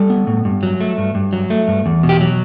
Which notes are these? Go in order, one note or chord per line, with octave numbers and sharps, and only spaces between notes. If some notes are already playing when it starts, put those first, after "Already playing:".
Already playing: G3 A4
B3
A2
G2
F#3
A3
G2
G2
F#3
A3
G2
E2
B2
G4
F#3